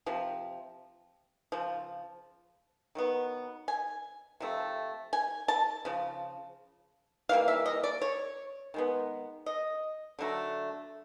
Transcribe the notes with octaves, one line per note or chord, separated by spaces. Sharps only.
C3 F3
C#3 F3
D#3 F#3 B3
G#5
C3 F3 A3
G#5
A5
C#3 F3
E3 G3 A#3 F5
E5
D#5
D5
C#5
D#3 G#3 B3
D#5
D3 F#3 A3